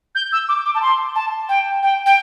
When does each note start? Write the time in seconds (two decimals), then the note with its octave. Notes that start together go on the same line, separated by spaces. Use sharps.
0.15 G6
0.33 E6
0.49 D6
0.65 D6
0.75 A5
0.82 C6
1.15 A5
1.49 G5
1.83 G5
2.06 G5